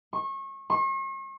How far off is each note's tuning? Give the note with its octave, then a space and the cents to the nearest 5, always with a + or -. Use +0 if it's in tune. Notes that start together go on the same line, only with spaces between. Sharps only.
C#6 -30
C#6 -45